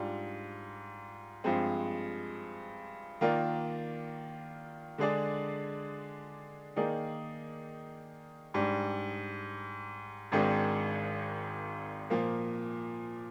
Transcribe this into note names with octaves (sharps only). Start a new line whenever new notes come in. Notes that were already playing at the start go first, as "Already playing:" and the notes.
Already playing: G#2 G3 D4 F4
G2 F3 G#3 C4
D#3 A#3 F4 A#4 D5
D3 G#3 D4 G#4 D5
D#3 A#3 D#4 G#4 D5
G#2 G3 D4
G#1 G#2 D#3 G#3 D4
A#2 F3 A#3